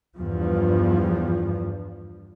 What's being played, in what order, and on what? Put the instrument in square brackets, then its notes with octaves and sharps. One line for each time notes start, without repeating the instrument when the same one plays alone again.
[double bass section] E2 G2 F3